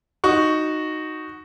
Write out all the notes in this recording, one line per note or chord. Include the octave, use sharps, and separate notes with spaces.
D#4 F#4 C#6